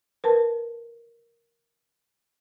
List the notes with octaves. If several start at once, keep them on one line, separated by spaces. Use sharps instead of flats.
A#4 B4 A5